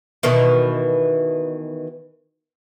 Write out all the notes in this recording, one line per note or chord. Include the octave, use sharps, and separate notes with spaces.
B2 D#3 E3